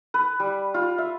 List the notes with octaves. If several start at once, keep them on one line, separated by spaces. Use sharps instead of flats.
B4
G3
F4
E5